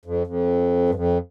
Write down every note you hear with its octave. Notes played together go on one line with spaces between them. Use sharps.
F2
F2
G2
F2